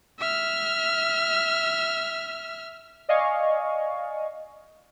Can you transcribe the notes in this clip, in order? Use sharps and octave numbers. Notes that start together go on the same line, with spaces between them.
E5 F6
D5 D#5 F5 G#5 C#6